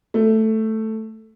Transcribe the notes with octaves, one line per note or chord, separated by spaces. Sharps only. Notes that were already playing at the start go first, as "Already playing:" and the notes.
A3